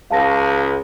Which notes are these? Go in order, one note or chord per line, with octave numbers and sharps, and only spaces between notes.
C#2 F5 A5 A#6